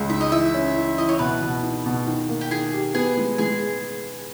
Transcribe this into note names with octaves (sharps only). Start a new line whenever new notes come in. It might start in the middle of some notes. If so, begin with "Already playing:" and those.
Already playing: C#2 C#3
D#4 E5
D#5
E3 E5
C#4
E3
E3 D#5
C#5
B2 B4
B2
D#4
B2
D#3
A#3
G4
D#3 G#4
G4
B3 G#4
G#3
G#3 G#4